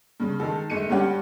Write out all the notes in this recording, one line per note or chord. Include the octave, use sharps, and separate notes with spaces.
G2 C#3
D#3 G#3 A4
G1 G#3 C#7 D#7
G2 C#4 G4 F#5